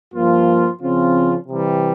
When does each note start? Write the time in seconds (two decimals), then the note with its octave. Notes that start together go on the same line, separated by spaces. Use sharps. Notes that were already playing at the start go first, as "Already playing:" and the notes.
0.14 G2 F3 A#3 F4
0.81 C#3 F3 C4 F4
1.49 C3 E3 G3